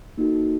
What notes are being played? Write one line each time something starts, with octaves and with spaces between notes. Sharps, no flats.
A#3 D#4 F#4 A4